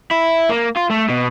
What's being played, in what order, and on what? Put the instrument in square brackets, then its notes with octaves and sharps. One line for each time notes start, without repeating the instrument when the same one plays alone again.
[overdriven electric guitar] E4
A#3
F4
A3
B2